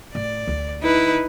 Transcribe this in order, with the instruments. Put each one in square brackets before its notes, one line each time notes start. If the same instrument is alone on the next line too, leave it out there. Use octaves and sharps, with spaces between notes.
[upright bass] A2 [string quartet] D5
[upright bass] D2
[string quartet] D#4 E4 B4